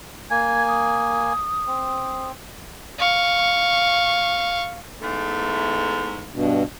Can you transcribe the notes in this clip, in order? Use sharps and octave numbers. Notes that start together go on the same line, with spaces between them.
A#3 G#5 G#6
D#6
C4
F5 C#6
E2 G#2 A3
G2 B2